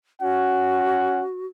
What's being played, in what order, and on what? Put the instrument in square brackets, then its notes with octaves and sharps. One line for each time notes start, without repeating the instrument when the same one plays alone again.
[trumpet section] C#4 F#5 [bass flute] F#4